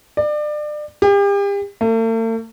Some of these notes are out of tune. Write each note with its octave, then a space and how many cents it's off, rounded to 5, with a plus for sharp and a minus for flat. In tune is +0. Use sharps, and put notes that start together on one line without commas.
D5 +30
G4 +40
A3 +45